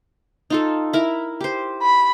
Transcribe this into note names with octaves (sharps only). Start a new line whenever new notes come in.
D#4 F4 A4
E4 A#4
G4 C5
B5